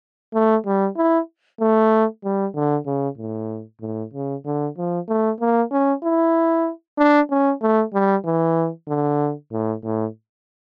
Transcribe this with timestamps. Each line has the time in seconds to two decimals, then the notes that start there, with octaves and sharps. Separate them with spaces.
0.34 A3
0.66 G3
0.97 E4
1.61 A3
2.24 G3
2.55 D3
2.87 C#3
3.18 A2
3.81 A2
4.14 C#3
4.46 D3
4.78 F3
5.09 A3
5.40 A#3
5.71 C#4
6.04 E4
6.98 D4
7.31 C#4
7.62 A3
7.94 G3
8.25 E3
8.88 D3
9.52 A2
9.84 A2